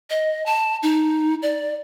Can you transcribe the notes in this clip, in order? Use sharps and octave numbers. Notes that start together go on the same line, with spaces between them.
D#5
A5
D#4
D5